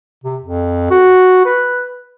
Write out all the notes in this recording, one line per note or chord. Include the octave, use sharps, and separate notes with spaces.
C3
F2
F#4
B4